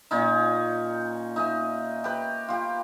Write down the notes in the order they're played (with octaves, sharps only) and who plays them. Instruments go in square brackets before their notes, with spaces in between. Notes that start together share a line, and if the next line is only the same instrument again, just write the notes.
[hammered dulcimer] A#2 C#4 D#4
D#4 E5 G#5
G4 B4
F4 G4